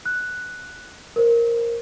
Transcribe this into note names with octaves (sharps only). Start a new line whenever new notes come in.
F#6
A#4 C5